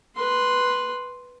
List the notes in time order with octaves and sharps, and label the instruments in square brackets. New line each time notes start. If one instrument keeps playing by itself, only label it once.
[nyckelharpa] B4 C6